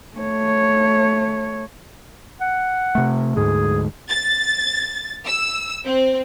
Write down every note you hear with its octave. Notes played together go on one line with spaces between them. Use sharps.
A3 C#5
F#5
C3 A3
D2 G#2 G#4
A6
E6
C4